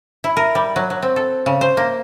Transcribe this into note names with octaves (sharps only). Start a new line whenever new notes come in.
E4
A#4
G3
F#3
F#3
C4
A4
C#3
C5
A#3